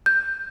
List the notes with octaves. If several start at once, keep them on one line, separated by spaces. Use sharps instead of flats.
G6